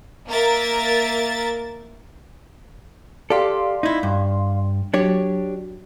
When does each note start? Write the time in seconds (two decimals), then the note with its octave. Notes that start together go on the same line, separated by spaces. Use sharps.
0.27 A#3 A#4 E5 A6
3.30 G4 A4 D5 F5 C6
3.83 D#4 E4
4.03 G2
4.94 F#3 D4 G4 C#5